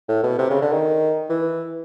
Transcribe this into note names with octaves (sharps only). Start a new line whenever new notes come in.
A2
B2
C3
C#3
D3
D#3
E3